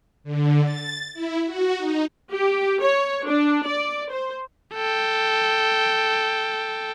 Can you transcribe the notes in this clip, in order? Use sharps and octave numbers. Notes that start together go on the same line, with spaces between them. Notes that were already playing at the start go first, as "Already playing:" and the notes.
D3
A6
E4
F#4
D#4
G4
C#5
D4
D5
C5
A4 G5